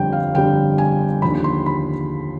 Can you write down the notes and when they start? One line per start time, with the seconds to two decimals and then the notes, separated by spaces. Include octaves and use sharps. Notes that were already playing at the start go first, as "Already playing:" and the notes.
Already playing: G1 F2 D3 G3 G5
0.12 F5
0.34 G1 F2 D3 G3 G5
0.78 G#5
1.22 D#2 D3 F3 B5
1.44 C6
1.66 B5